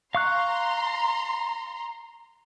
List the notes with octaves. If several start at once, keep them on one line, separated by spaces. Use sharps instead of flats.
F5 A#5 C6 C#6 F#6